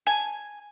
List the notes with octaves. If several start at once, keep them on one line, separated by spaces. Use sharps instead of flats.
G#5